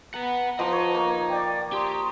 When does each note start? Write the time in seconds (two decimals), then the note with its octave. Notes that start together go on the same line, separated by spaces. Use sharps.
0.14 B3 B4 F#5 A#5
0.59 F3 D#5 A#5 C6 D6
0.73 C#5
0.94 A#3
1.30 D5 G5 D6
1.72 G4 A#5 C6 D#6